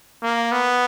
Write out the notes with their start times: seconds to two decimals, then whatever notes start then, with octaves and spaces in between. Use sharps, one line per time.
0.23 A#3
0.52 B3